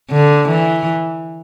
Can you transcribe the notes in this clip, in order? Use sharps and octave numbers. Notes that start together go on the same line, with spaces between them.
D3
E3